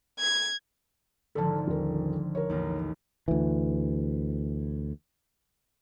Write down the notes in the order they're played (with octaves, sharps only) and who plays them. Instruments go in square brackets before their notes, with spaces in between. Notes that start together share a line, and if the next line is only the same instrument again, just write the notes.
[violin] G#6
[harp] G#1 D3 F3 [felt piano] A4 A5
[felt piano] D#1 A#4
A#4 C#5
[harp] A1 D#2
[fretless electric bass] D2 E3